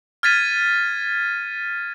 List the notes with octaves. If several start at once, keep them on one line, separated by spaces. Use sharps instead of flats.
F6 G#6 A6 B6 D#7